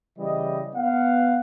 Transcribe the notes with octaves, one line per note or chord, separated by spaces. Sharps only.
C#3 E3 G3 D#5
B3 F5 F#5